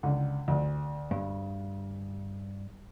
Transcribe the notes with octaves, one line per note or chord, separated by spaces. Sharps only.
C#2 D3
D2
G2